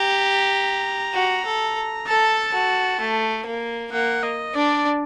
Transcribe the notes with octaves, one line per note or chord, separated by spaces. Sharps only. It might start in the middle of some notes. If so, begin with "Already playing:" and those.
Already playing: G4 A#5
F#4
A4
A4 A5
F#4
A3
A#3
A#3 F#5
D#5
D4 D5